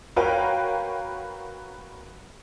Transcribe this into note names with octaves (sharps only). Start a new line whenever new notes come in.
F#4 A#4 B4 C#5 F5 G5